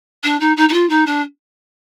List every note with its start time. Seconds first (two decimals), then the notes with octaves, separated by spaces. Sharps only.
0.23 D4
0.40 D#4
0.56 D#4
0.69 D#4
0.73 F4
0.89 D#4
1.06 D4